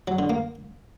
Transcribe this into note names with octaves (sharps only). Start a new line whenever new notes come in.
F#3
D3
A#3